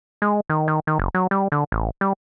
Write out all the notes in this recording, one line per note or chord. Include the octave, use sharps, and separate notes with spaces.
G#3
D#3
D#3
D#3
F#1
F#3
G3
D3
A1
G3